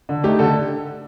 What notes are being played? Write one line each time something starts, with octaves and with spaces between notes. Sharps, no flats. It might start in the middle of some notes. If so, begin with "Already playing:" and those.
D3
A3 D#4 G4
D3 A4